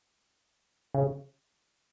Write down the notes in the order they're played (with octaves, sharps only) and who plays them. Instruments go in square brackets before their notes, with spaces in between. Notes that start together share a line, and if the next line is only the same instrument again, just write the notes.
[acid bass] C#3